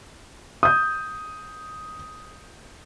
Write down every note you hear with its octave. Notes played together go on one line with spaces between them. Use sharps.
D#6 G6